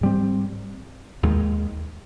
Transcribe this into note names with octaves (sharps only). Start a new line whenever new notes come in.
G#2 G3 C4
D#2 D#3 G#3